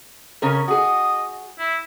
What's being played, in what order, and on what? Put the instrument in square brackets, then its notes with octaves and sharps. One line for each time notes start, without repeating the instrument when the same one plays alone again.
[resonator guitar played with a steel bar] C#3 C#4 A#4
[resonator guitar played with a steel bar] F#4 G#4 [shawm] D#5
[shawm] E4